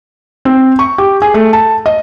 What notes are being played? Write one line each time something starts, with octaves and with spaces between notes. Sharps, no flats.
C4
C#6
G4
G#4
A3
A5
D#5